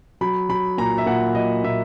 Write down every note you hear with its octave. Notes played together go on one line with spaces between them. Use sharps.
F#3 B5
F#3 B5
A#2 A#5
E5
A#2 F#5
F#3 D#5
A#2 E5